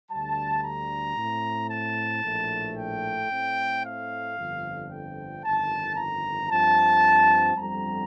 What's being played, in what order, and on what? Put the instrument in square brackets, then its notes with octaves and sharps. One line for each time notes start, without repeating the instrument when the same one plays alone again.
[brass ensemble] D2 D3 G3 A5
A#5
A2 A3 C4
A5
A#1 A2 A3
G5
A2 A3 C4
F5
G1 F2 D3 F3
G5
G1 F2 D#3 A5
A#5
G2 F3 C4 A5
G1 F2 D3 G3 C4 A#5